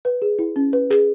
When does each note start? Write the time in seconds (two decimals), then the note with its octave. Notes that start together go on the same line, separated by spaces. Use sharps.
0.05 B4
0.22 G#4
0.39 E4
0.56 C#4
0.73 B4
0.90 G#4